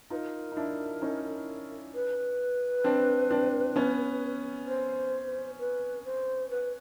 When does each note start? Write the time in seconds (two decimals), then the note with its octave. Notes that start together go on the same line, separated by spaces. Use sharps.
0.10 D#4 F4 A#4 B4
0.52 D#4
0.57 D4 E4
1.02 C#4 D#4
1.93 B4
2.84 C4 D4
3.31 C4 D4
3.76 B3 C#4
4.67 C5
5.58 B4
6.04 C5
6.49 B4